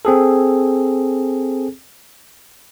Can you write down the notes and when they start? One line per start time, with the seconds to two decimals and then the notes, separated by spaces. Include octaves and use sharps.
0.05 C4 G#4 A4